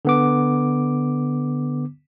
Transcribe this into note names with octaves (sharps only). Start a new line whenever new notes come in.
D3 B3 D6